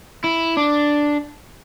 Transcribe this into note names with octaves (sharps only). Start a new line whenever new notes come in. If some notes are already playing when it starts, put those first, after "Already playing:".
E4
D4